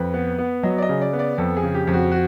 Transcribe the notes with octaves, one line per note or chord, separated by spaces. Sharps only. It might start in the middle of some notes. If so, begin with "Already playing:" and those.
Already playing: F2 B4
B3
B3
F#3 D#5
D5
D#5
C#3
D5
B3
D5
F2 A4
G#4
C#3
G4
F2
F#4
F#4